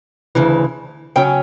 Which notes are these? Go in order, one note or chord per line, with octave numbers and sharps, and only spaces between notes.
D2 C#3 E3
C#3 F#3 C#4 G5